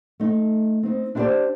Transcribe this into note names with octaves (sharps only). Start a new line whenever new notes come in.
A3 D#4
C4 D#4
D4 E4 G4 B4 C5 D5